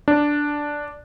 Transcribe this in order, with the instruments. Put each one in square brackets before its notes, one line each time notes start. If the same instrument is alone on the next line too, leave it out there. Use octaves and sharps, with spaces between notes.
[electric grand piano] D4